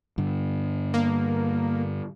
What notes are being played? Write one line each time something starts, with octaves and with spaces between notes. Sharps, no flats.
G2 D3
A#3